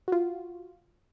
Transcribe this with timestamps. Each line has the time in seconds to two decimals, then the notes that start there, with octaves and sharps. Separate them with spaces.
0.08 F4 F#4